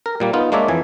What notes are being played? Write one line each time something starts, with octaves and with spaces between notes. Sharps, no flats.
A#4
A#2 G3 A#3
B3 D#4 F4
G#3 A#3 D4 C#5 D5 E5
F2 E3 G#5